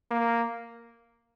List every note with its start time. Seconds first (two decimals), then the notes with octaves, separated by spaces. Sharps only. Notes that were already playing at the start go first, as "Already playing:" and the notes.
0.11 A#3